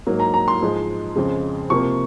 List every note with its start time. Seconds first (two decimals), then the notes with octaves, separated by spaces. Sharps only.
0.07 G#2 F#3 A#3
0.20 A#5
0.34 A#5
0.48 C6
0.61 G#2 F3 G#3
1.16 F2 C#3 G#3
1.70 C3 F3 A#3 C#6